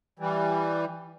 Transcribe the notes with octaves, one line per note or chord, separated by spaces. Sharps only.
E3 G3